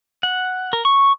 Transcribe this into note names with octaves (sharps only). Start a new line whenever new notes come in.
F#5
A#4
C#6